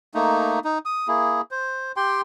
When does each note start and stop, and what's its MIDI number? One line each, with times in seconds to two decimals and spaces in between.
0.14 0.59 57
0.14 0.59 58
0.14 0.59 63
0.65 0.78 63
0.85 1.08 87
1.08 1.41 58
1.08 1.41 64
1.08 1.41 68
1.51 1.92 72
1.97 2.21 67
1.97 2.21 79
1.97 2.21 84